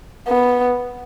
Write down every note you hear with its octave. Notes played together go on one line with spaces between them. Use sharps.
B3